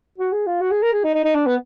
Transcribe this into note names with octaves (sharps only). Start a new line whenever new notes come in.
F#4
G#4
F4
F#4
G#4
A#4
G#4
D#4
D#4
D#4
D4
B3